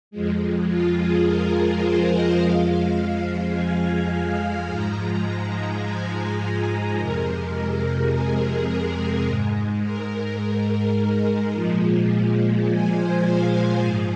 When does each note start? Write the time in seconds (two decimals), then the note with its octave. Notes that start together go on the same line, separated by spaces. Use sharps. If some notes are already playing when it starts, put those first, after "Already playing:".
0.11 F2 F3 G#3
0.68 F4
0.97 G#4
1.25 A#4
1.83 C5
2.11 D#5
2.39 F2 F3 G#3 F5
3.54 G#5
4.68 G#2 F3 G#3 A#5
5.82 G#5
6.97 F2 C3 G#3 A#4
8.11 G#4
8.39 A#4
8.69 G#4
9.26 G#2 G#3
9.82 A#4
11.54 A#2 F3 G#3
12.68 G#5
12.96 C5
13.26 F5
13.83 G#2 F3 G#3